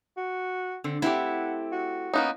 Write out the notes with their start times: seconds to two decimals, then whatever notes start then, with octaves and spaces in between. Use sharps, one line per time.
0.17 F#4
0.84 D3 C4
1.02 A3 C4 E4 G4 F#5
1.72 F#4
2.14 A#3 B3 C#4 D#4